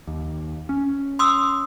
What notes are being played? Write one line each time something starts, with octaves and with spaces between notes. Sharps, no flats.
D#2
C#4
C6 D#6 E6